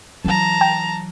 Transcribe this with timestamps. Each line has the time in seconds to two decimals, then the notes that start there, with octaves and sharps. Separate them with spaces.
0.25 E3 F#3 A5 A#5
0.61 G5